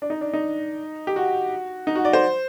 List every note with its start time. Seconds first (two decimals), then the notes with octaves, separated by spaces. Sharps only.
0.02 D4
0.10 D#4
0.21 D4
0.33 D#4
1.07 G4
1.16 F#4
1.87 D#4
1.96 F#4
2.05 D5
2.13 C5